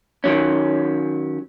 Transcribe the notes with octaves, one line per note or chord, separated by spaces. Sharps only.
D#3 F#3 C#4